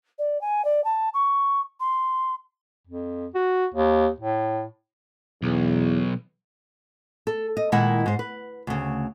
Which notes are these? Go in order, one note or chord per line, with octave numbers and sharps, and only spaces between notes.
D5
G#5
D5
A5
C#6
C6
F2
F#4
D#2
A2
B1 E2
A4
D#5
A#2 D#3 G#3 E4 F#5
G#2 C5
B4
D2 C#3